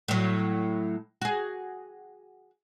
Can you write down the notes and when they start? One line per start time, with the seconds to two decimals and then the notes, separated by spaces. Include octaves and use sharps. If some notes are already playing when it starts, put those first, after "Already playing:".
0.08 A2 F#3
1.22 F#4 G#4